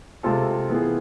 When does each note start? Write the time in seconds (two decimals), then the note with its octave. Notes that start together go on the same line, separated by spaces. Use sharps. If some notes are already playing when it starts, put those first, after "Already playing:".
0.23 C3 G#3 C4 F4 A4
0.70 E3 B3 F4 G#4